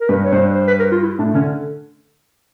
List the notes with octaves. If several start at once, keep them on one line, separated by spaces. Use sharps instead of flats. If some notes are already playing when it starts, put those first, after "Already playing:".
A#4
G2 B4
C#5
G2 C5
C5
B4
A#4
F4
E4
A2 D4
D3 C#4